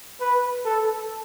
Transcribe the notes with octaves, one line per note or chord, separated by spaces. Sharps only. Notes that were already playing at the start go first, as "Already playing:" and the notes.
B4
A4